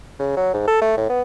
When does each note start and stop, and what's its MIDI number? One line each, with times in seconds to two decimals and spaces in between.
0.19 0.31 49
0.37 0.53 54
0.54 0.63 44
0.67 0.80 69
0.81 0.95 57
0.97 1.04 45
1.09 1.22 59